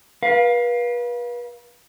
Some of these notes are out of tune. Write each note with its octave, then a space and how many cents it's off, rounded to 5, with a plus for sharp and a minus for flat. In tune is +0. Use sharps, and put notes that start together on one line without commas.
B4 -35 F5 +10